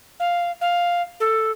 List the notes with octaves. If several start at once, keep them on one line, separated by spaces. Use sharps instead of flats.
F5
F5
A4